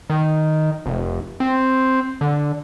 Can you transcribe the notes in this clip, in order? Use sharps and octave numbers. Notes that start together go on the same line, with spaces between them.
D#3
F1
C4
D3